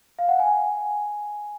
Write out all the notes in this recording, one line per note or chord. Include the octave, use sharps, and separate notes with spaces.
F5
F#5
G#5